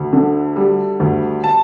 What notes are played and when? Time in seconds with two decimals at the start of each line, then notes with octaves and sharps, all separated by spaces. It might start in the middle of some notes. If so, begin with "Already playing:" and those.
Already playing: D2
0.13 D3
0.56 G3
1.00 D2
1.44 A5